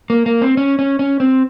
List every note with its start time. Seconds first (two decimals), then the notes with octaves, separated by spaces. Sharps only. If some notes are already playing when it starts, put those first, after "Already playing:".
0.10 A#3
0.26 A#3
0.42 C4
0.57 C#4
0.79 C#4
0.99 C#4
1.20 C4